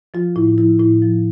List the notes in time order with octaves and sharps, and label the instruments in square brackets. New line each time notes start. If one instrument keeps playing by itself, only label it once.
[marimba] F3 F4
A2 E4
F3 E4
A2 E4
F3